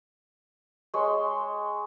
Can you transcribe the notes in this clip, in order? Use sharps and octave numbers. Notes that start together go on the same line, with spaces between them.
G#3 C#5 C6 E6